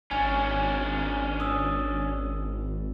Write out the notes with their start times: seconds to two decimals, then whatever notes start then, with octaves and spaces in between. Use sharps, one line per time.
0.11 G#1 C#4 D4 G#5
1.40 D#6 E6